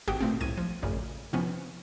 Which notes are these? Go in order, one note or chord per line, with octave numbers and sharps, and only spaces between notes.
G#1 F#4 G4 G5 D#6
A#2 A3 C4
C2 A2 G#6 D#7
F3
A1 F#2 A#2 C#3
C3 F3 B3 C#4